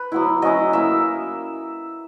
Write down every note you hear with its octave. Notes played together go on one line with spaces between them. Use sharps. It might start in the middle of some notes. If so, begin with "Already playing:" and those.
Already playing: B4
F#3 B3 E4
F#3 C#4 E4 D#5
A#3 E4 E5